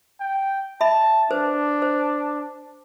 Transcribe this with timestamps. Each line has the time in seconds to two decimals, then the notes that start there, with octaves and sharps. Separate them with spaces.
0.20 G5
0.81 E5 A5 B5
1.31 D4 B4 C5
1.82 C5